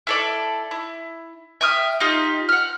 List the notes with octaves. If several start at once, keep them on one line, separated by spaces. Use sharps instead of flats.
E4 A4 D5
E4
E5 G5 D#6 F6
D#4 F4 G4
F#5 F6